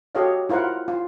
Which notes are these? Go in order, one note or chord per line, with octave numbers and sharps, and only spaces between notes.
F#4 G4 A4 C#5 D#5 F5
E4 F4 A#4 C5 F#5
F4